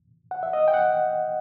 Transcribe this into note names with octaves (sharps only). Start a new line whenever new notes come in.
F#5
E5
D#5
G5
F#5